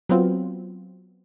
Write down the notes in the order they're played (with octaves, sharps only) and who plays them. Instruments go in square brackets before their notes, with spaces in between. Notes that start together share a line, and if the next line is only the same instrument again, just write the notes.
[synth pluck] F#3 B3 C4 F4